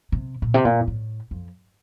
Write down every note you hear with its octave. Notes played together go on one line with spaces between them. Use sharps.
C3
A#2
C3
A#2
A2
F2